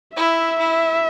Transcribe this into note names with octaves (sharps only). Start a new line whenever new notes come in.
E4 E5
E4